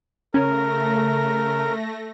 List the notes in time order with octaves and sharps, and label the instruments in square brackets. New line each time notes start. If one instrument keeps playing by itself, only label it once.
[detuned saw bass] C#3 [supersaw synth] A3 A#6 [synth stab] C#4 [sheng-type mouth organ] A#4